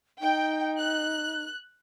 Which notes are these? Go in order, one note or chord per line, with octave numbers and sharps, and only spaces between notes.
D#4 G5
F#6